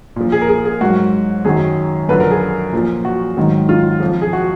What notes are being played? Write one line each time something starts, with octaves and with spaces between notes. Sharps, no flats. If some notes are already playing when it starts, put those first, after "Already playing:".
A#2 F3
G#4
A#4
G#4
G#4
G#2 F#3 F#4
F#2 D#3 F#3 G#4
F#2 D3 F3 B4
A#4
G#4
A#2 F3
F#4
G#2 D#3 F#3
F4
F2 F3
G#4
F#4